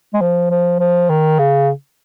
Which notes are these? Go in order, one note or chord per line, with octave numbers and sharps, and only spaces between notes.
G#3
F3
F3
F3
D#3
C#3